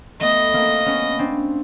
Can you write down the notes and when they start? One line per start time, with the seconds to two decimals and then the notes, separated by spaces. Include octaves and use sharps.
0.20 A3 B3 D#5
0.53 A#3 C4
0.86 B3 C#4
1.19 C4 D4